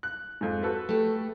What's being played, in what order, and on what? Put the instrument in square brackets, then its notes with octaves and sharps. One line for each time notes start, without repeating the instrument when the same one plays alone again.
[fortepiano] F#6
F2 G#2
F#4 A4 B4
[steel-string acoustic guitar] A3 G4